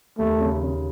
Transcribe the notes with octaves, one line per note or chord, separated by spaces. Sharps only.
D#2 A3
C#3
C#3